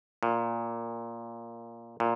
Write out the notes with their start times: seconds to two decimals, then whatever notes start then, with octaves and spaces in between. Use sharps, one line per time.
0.23 A#2
2.00 A#2